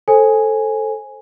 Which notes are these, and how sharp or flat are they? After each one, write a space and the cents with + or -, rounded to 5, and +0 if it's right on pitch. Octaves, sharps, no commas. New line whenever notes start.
A4 +0 C5 +25 G#5 +0